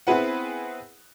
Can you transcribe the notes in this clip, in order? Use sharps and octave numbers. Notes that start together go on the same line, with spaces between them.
B3 C4 E4 G#4 B4 F#5